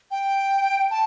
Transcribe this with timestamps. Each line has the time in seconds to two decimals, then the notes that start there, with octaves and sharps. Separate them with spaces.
0.11 G5
0.90 A5